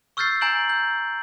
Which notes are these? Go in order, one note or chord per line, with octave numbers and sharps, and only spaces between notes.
C#6 E6 F6 G6 A6 C7
G#5 A#5 G6 D7 F#7
G6